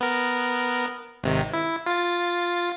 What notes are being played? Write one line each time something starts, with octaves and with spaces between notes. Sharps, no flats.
B3 A#4
G#1 C3 D#3
E4
F4 A6